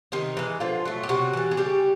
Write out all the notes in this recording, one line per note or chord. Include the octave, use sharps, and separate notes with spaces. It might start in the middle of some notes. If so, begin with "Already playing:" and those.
C3 D#3 D#4
E3 G#3
D3 F3 F4
F#3 A3
G4
C3 F#3 F#4
E3 G3
G#4
C#3 G3 G4